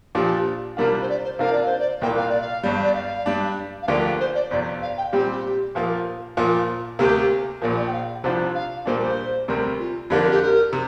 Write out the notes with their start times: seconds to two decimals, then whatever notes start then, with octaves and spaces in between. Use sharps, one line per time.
0.15 A#2 F3 D4 F4 G4
0.77 C2 C3 G3 D4 F4 A#4
1.02 C5
1.09 D5
1.24 C5
1.39 C3 A#3 D4 F4 A#4 F5
1.52 D5
1.65 C5
1.79 D5
2.01 C2 A#2 A#3 G5
2.17 F5
2.29 D5
2.41 F5
2.63 G1 G2 G3
2.83 D5
2.95 F5
3.26 G2 G3 D4
3.82 F5
3.88 D2 D3 F3 A#3 G4 D5
4.20 C5
4.34 D5
4.51 G1 F2 C3 D5
4.82 F5
4.97 G5
5.12 A#2 G3 C4 G4
5.75 A#2 F3 A#3 F4
6.37 A#2 F3 A#3 F4
6.99 D2 C3 A#3 G4
7.61 A#1 A#2 F3 A#4
7.77 D5
7.87 G5
7.93 F5
8.24 C2 C3 F3 D4 F4 C5
8.55 F5
8.86 A#1 A#2 G3 A#3 D4 C5
9.02 C5
9.48 D2 C3 G3 C4 A#4
9.79 F4
10.10 F2 D3 A#3 D4 G4 A#4
10.31 G4
10.42 A#4
10.73 C3